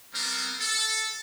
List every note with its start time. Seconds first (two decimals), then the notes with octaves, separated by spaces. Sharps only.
0.14 G3 B3 C4 A#4
0.60 A4